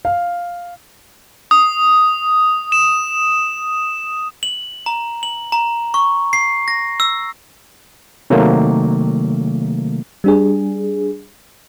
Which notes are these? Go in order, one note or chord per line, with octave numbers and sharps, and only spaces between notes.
F5
D#6
E7
F#7
A#5
F#7
A#5
C#6
C7
A#6
E6
C3 D#3 F#3 A3 A#3
G3 D4 G#4